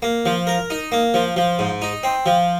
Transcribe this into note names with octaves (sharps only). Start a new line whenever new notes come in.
A#3
F3
A#4
D#4
A#3
F3
F3
G#2
D#4
C4
F3